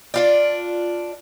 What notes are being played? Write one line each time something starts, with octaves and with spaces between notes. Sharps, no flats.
D4 F4 D5